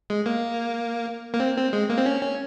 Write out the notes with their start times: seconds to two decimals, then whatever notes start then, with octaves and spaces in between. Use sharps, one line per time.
0.10 G#3
0.26 A#3
1.34 A#3
1.40 C4
1.57 C4
1.73 G#3
1.90 A#3
1.98 C4
2.06 C#4
2.22 C#4